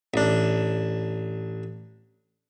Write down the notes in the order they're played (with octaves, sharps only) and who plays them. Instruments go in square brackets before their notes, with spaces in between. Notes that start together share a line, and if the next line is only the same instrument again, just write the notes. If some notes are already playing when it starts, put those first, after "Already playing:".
[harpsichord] A1 D4